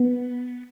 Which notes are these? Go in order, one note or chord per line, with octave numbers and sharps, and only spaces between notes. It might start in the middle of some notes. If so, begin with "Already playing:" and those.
Already playing: B3